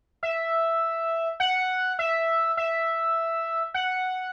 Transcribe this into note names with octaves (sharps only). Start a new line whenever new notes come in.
E5
F#5
E5
E5
F#5